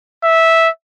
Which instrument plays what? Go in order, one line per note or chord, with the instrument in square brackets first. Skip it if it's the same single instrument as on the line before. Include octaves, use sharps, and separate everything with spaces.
[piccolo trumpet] E5